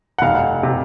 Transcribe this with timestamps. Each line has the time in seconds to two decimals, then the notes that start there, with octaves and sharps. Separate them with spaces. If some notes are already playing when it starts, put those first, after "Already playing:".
0.18 F#5
0.22 F1 F5
0.63 C3